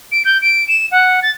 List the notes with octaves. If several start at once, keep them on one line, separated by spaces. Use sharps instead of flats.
D7
G6
D7
E7
F#5
A6